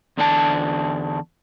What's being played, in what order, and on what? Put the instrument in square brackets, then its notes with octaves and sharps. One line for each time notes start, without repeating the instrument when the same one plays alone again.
[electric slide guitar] E2 D3 D4 D#4 A5